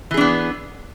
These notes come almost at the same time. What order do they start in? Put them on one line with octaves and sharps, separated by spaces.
E3 G#4 D4 B3